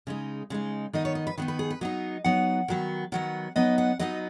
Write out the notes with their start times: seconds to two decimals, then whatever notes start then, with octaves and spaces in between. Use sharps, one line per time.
0.07 C#3 G#3 D#4
0.50 C#3 G#3 D#4
0.93 D#3 B3 D#4 D#5
1.05 C#5
1.15 D#5
1.27 B4
1.37 D#3 B3 D#4 B4
1.48 B4
1.59 G#4
1.70 B4
1.81 F#3 B3 D#4 D#5
2.24 F#3 B3 D#4 F#5
2.68 D#3 F#3 B3
3.12 D#3 F#3 B3 F#5
3.56 F#3 B3 D#4 D#5
3.78 F#5
3.99 F#3 B3 D#4 D#5